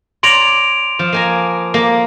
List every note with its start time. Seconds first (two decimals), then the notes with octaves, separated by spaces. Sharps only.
0.23 C#5 D5 A#5 C6 D7 F7
0.99 F3
1.13 A#3 G#5 A#5
1.74 A#3